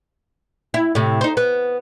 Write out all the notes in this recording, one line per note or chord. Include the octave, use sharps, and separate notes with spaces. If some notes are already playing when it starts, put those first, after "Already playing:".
E4
A2 C3
D#4 C5
B3